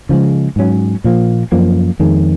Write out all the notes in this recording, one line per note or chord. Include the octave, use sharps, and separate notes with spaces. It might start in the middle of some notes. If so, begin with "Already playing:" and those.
C#3 F3 G#3
G#2 F#3 C#4
A#2 F3 A#3
F#2 F3 A#3
F2 D#3 G#3